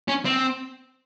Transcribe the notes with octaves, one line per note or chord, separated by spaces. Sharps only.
C#4
C4